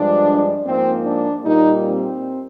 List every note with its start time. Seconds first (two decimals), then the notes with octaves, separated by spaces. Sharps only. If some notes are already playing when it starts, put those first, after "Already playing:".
Already playing: G2 F3 G#3 D4
0.66 G#2 F3 A#3 C4
1.05 D4
1.44 A#2 G3 A#3 D#4
1.83 C4